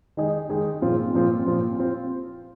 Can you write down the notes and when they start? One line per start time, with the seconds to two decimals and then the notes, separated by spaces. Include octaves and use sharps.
0.17 D#3 G#3 D#4 G#4
0.49 D#3 G#3 D#4 G#4
0.82 A#2 F3 C4 F4
1.14 A#2 F3 C4 F4
1.46 A#2 F3 C4 F4
1.79 C4 F4